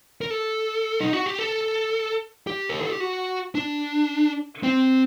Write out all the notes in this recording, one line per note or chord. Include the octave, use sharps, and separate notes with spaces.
A#4
A4
D#4
F#4
G4
A4
G4
A#4
A4
G4
F#4
D4
C4